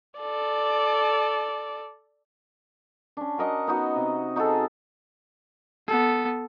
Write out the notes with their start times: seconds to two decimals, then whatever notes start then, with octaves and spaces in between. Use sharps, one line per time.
0.19 A4 D5
3.17 C#4 D4
3.38 F#4 A#4 D#5 F#5
3.67 B3 D#4 F#4
3.96 C3
4.36 D#4 F#4 G#4 A4
5.87 B3 A4